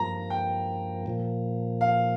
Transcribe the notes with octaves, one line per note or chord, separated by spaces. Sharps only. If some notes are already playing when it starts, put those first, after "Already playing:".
Already playing: G2 F3 A#3 A#5
G5
A#2 F3 A#3
F5